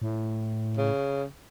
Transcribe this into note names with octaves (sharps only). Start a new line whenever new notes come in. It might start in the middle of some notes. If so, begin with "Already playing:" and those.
A2
C#3